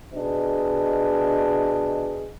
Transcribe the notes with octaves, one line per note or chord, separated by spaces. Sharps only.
B2 D4 G#4 B4 D#5